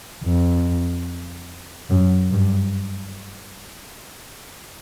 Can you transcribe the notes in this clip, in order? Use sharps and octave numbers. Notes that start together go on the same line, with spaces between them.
F2
F#2
G2